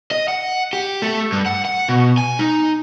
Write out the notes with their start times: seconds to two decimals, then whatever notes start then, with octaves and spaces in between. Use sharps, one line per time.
0.11 D#5
0.28 F#5
0.73 G4
1.02 A3
1.32 G2
1.46 F#5
1.65 F#5
1.88 B2
2.18 G#5
2.39 D#4